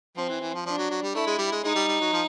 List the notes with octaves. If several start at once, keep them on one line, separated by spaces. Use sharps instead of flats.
F3 C4
E3
E3
F3
F3 D4
F#3
F#3
G3
A3 E4
G#3
G3
G#3
G#3 D#4
G3
G3
F#3
F3